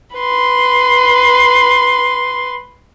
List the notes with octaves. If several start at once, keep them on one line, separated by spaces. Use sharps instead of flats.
B4 C6